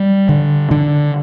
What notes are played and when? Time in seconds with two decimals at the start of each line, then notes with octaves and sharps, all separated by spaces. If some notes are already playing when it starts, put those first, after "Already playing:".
Already playing: G3
0.29 D3
0.71 D3